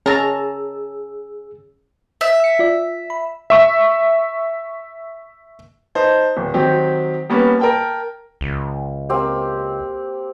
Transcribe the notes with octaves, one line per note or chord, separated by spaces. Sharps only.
C#4 G#4 A#4 A5 A#5 E6
E5
E6 C#7
F4 D5
B5
E5 C#6 E6
D#4 C5 A5
D1
D#3 F#3 C4 G4
G3 A#3 B3 C#4
A#4 G5 A5
C#2
A#3 C4 G4